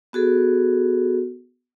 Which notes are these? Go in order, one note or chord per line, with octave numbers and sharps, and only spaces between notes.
B3 F#4 G#4 A4